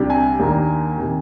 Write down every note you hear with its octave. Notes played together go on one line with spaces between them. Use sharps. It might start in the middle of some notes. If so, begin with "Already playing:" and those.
Already playing: C2 C3 G3 D4
G#5
D#2 D#3 A#3 D4
C3 D#3